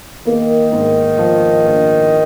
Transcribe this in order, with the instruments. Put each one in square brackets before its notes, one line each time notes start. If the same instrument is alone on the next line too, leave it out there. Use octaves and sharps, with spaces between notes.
[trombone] D#3 [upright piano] A#3
[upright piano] G#2
F3
A#1